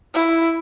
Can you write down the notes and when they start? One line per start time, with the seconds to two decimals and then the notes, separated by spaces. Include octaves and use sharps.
0.14 E4